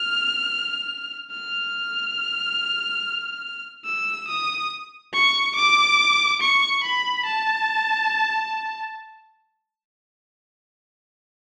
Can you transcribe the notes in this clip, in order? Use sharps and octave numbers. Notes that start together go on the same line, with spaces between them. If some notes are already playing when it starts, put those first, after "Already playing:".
Already playing: F6
F6
E6
D#6
C#6
D6
C#6
B5
A5